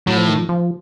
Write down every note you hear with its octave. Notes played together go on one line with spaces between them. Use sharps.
A2 F#3
F3
D#3
F3
F3